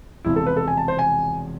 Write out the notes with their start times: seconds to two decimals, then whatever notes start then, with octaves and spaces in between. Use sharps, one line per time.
0.25 E1 E2 C3 F3 E4
0.36 A4
0.47 B4
0.57 A4
0.68 G#5
0.77 A5
0.88 C5
0.99 G#5